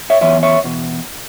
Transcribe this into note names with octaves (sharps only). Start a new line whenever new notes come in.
C#5 E5
F#2 E3 B3 C#5 E5
C#5 E5
E2 B2